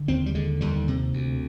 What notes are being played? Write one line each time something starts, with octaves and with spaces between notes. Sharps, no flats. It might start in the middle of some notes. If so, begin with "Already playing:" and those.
Already playing: D3
D#2 C4
G3
D3 G#3
D#2 G3
C3
D2